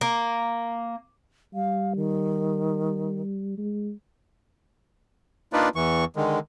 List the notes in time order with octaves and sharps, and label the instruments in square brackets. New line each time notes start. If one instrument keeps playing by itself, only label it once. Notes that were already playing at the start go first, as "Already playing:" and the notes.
[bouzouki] A#3
[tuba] G3 [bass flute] F5
[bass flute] D#3
[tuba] G#3
[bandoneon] A#3 D4 D#4 F4 B4 D5
E2 E3 C#6
D3 D#3 G#3